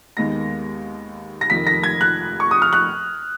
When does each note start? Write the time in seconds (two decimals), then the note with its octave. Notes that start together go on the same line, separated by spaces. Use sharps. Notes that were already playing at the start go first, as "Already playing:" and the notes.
0.17 D#2 D#3 G#3 B3 D#4 A#6
1.41 A#6
1.50 F1 F2 D#3 B6
1.67 A#6
1.83 G#6
2.01 F#6
2.40 C#6
2.51 D#6
2.62 F6
2.73 F#6